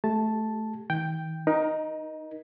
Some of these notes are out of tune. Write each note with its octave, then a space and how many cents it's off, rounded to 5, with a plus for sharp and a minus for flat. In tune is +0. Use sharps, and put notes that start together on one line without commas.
A3 -15 G4 +0 A5 +0
D#3 +45 G5 +0
D#4 +0 A#4 +30